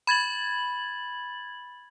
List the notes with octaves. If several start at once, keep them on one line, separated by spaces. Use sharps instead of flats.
B5 G#6 A6 F#7